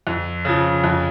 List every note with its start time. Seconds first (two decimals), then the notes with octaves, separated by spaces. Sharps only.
0.07 F2
0.45 C#3 F3
0.84 F2